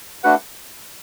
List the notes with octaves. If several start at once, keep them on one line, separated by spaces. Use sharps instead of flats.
A3 D4 F#4 B4 F#5